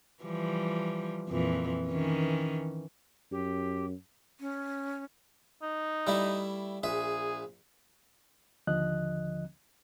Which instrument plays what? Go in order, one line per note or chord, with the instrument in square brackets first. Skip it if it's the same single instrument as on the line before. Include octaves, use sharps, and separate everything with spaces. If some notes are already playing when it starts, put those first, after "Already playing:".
[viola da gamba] E3 F3 G3
F2 A#2 E3
D#3 E3 C#4
[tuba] F#2 [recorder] G4
[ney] C#4
[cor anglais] D#4
[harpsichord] G3 A3 E4
[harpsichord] A#1 E5 [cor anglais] G#4
[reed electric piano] D#2 D3 F3 D#5 F#6